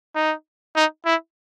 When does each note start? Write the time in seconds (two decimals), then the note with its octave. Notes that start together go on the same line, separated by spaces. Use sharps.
0.15 D#4
0.76 D#4
1.06 E4